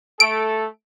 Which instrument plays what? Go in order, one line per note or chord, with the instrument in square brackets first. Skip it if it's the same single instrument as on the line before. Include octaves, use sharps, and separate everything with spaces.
[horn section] A3 A4 [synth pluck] D7